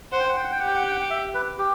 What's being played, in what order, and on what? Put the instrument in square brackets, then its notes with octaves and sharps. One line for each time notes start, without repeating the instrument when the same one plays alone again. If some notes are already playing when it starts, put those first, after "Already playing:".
[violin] C5 [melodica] F#5
[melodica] G5
F#5
G5
F#5
G5
[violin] G4 [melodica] F#5
[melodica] G5
F#5
G5
F#5
E5
B4
G4